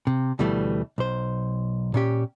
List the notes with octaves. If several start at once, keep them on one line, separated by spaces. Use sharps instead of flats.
C3
D2 B2 E3 G3 A3
B1 C5
A#2 C#4 G4